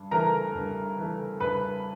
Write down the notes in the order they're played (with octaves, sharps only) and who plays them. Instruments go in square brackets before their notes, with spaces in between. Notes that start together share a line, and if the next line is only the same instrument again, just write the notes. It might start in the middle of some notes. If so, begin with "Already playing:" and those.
Already playing: [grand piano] G2
E3 A3 A#4 A#5
G2
E3 A3
G2 B4 B5